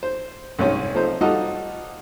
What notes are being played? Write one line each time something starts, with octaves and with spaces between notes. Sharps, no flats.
C5
C2 G#2 C#4 C#5
F3 A3 C4 D#4 C5
G3 D#4 F4 F#4 A4 D#5